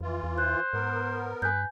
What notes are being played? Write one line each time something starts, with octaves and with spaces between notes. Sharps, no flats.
F2 E3 F4
E2
C5 F#6
G#2 B3 A#4
G2 B4 G#5 G6